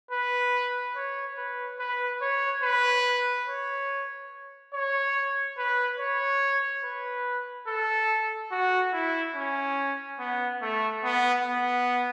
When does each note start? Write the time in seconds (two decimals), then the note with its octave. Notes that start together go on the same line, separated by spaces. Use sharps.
0.11 B4
0.96 C#5
1.38 B4
1.80 B4
2.22 C#5
2.63 B4
3.47 C#5
4.74 C#5
5.58 B4
6.00 C#5
6.84 B4
7.67 A4
8.52 F#4
8.93 E4
9.36 C#4
10.19 B3
10.62 A3
11.04 B3
11.46 B3